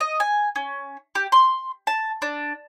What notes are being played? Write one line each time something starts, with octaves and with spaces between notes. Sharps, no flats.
D#5
G#5
C#4
G4
C6
A5
D4